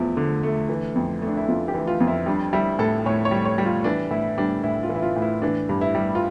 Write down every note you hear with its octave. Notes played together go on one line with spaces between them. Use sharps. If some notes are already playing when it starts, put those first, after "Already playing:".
Already playing: E2 F3 A3 E4
D3
A3
E3
F2
A3
D4
E4
F2 F4
G4
E3
F4
F2
E4
G3 D4
G3 E4
A2 A4
A2 C#5
C#5
G3
C#5
G3
F4
E3 D4
A2 E4
G3 D4
A2 E4
F4
E3
E4
F4
A2
E4
E3 D4
G2
E4
G3
F4